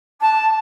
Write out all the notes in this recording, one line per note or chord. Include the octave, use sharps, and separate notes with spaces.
A5